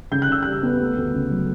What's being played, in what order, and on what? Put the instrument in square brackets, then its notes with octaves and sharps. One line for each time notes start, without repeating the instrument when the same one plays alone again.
[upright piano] C#3 G6
F#6
C#3 E6
G3 F#6
B3
A3
D2
C#3
F#3